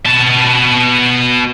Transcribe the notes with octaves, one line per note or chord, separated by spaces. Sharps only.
B2 A5